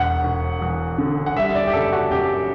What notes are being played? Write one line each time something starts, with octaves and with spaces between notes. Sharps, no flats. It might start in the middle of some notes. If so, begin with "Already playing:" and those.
Already playing: E1 F#5
E1
E2
D3
F#5
G3 E5
D5
G4
F#1 A4
F#4
F#2 G4